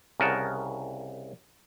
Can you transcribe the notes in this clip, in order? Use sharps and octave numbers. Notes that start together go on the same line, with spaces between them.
C2 C#3 A#4 D#5 F#5 A5